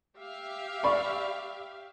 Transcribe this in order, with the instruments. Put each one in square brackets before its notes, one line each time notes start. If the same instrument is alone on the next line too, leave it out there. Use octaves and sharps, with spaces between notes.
[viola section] G4 E5 F5
[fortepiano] D5 B5 C#6